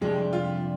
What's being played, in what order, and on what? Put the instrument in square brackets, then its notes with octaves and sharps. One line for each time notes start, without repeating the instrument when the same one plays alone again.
[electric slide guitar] F2 C3 G3 D4 G4 [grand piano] G#3
[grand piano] F4